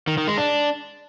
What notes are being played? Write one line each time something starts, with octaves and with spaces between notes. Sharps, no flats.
D#3
D#3
G#3
D4